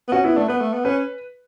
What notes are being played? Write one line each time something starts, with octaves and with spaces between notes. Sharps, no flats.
B3
C#4 F#4
B3 E4
A3 D4
B3 B4
A3
B3
C#4 B4